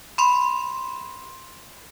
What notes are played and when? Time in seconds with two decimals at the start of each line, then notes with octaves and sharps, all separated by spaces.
0.18 B5 C6